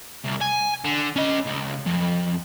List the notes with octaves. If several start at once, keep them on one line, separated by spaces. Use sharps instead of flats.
C2
G#5
D3
C#4 D#5
C#2
F2